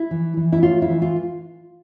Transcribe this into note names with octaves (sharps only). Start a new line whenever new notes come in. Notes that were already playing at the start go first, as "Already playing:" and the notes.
Already playing: E4
E3
E3
E4
A2 F4
E4
E3
F4